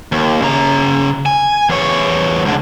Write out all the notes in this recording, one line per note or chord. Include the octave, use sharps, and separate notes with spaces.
D#2
C#3 A#5
G#5
E2 C#5
C#2 D3